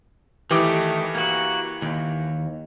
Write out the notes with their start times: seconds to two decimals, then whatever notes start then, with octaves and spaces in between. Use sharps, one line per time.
0.51 D#3 E3 A3 G4 D6
1.15 A#3 F#4
1.82 D#2